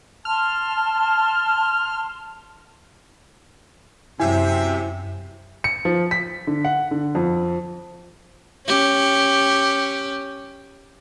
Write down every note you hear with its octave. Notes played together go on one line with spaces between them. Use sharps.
A5 C6 F6
F#2 C3 E4 E5 G#5
C#7
F3
B6
D3
F#5
D3
F2
C#4 G4